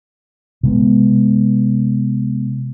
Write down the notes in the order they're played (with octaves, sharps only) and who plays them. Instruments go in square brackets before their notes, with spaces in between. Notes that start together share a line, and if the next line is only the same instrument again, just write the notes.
[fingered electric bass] C3 G#3 B3